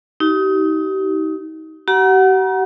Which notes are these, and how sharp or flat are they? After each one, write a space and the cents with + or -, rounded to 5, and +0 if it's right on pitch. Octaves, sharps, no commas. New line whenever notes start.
D#4 +25 G4 -35
G4 -45 F#5 +0 A#5 +35